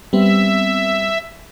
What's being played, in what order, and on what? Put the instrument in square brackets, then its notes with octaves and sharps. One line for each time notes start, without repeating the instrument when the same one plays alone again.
[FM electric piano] G3 B3 C4 [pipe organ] E5